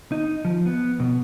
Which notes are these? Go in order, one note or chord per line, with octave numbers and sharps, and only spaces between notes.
D#4
F3
B3
B2